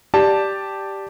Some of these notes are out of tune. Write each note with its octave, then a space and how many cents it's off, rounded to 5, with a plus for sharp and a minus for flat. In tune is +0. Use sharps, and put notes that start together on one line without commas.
G4 +0 D5 +0 A5 +0